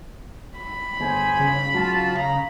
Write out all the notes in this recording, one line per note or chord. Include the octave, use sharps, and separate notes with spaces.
B5
G1 G#4 C5 G#5
C#3
F#3 F4 A5
F5 A#5